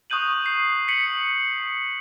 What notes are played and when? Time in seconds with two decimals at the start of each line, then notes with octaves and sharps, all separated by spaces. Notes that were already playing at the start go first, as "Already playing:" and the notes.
0.10 C#6 D#6 F#6 G6 D#7 F#7
0.46 C7
0.88 B6 C#7 F#7